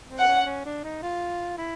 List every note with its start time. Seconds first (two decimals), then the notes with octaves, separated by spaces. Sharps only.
0.09 C4
0.18 F#5
0.28 C#4
0.46 C#4
0.66 D4
0.84 D#4
1.03 F4
1.58 E4